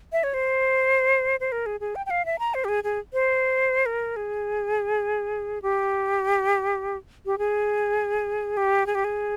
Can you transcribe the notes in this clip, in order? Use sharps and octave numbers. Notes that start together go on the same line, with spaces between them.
E5
C#5
C5
C5
A#4
G#4
G#4
G5
G5
F5
E5
A#5
C5
G4
G#4
G#4
C5
A#4
G#4
G4
G4
G#4
G4
G#4
G4
G#4